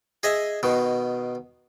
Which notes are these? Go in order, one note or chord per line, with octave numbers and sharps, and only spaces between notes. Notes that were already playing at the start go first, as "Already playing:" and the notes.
G#4 D#5 E5
B2 D#3